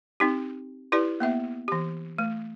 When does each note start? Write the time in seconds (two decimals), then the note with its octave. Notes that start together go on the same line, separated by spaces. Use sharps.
0.20 C4 D#4 G4
0.92 E4 G4 B4 D5
1.20 A#3 B3 E5
1.68 E3 G4
2.18 A3